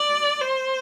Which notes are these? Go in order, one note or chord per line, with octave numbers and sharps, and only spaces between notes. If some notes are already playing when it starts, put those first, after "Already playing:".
Already playing: D5
C5